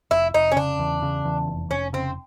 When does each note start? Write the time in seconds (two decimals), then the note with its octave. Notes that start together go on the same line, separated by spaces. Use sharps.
0.11 F1 E4
0.34 F1 D#4
0.52 C#4
0.56 C#3 D4
0.79 E2
1.02 C#3
1.25 E2
1.48 F1
1.70 F1 C#4
1.93 C#3 C4